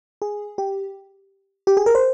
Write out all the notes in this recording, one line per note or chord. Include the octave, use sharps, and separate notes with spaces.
G#4
G4
G4
G#4
A#4
C5